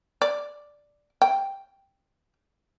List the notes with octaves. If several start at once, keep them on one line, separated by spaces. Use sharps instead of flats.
D5
G5